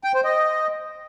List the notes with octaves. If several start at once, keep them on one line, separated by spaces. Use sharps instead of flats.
G5
C5
D#5